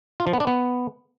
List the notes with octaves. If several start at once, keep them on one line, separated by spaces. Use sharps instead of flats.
F4
F3
B3
D4
B3